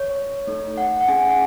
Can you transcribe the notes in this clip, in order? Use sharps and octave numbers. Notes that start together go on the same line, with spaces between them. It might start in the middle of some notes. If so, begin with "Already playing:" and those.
Already playing: C#5
A3 D#4 A4
F#5
F#5
C#4 G#4 G#5
G#5
F#5